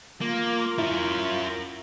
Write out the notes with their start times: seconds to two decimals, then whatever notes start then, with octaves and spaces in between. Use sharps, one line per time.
0.21 A#3 F4
0.78 C#4 E4 A#4